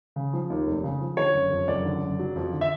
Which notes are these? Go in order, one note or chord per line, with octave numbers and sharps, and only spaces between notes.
C#3
F3
D#2
F1
C#3
F3
D3 C#5
F#1
F2
F#1 D5
D3
F#1
F#3
F2
D3
E5